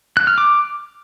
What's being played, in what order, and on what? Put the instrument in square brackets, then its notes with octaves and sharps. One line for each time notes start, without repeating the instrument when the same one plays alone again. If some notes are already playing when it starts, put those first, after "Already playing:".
[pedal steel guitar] F#6
F6
D6